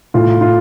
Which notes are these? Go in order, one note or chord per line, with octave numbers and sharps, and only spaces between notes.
A2 F4
F4